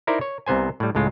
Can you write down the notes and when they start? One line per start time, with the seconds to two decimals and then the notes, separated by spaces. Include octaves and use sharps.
0.07 D#4 E4 A#4 C5 D5
0.21 C#5
0.46 C2 C3 B3 C5 G#5
0.80 A2 G3
0.95 C#2 A2 G#3 F4